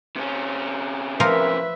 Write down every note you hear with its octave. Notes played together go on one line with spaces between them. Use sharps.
C3 C#4
F3 A#4 B4 E5